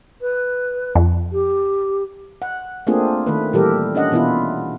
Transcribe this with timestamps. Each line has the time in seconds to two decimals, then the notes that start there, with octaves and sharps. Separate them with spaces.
0.21 B4
0.95 F2
1.32 G4
2.42 F#5
2.87 A3 A#3 C4 D4 F4 G#4
3.27 D#3 A3 B4
3.53 A#2 E3 G3 G4 A4 A#4
3.95 C#4 D4 D#5 F#5
4.12 B2 E3 B3 E4 F4